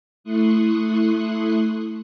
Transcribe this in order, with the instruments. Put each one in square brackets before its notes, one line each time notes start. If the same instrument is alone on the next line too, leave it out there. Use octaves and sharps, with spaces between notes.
[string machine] A3 E4 C6 C#6 D#6 F#6